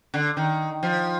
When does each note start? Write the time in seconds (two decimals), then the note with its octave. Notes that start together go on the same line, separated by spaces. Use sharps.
0.14 D3
0.37 D#3
0.83 F3